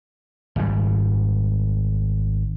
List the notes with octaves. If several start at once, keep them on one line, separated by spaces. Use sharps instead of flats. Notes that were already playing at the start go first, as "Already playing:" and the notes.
G#1 G#2 G3